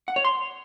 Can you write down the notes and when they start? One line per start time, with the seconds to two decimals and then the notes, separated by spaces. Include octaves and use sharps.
0.08 F#5
0.16 C#5
0.25 C6